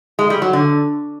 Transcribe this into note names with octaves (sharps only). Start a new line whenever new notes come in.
G#3
G3
F#3
D3